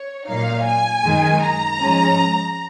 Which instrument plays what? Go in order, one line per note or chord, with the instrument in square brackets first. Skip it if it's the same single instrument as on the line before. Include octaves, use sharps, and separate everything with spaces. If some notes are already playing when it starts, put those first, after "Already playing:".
Already playing: [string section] C#5
A#2 F#3 A#3 D#4 F5
G#5
F#2 D#3 G#3
A#5
G#2 F3 G#3 C#4